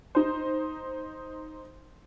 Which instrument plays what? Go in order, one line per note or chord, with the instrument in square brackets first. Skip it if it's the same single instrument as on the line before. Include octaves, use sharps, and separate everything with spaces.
[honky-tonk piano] D#4 C5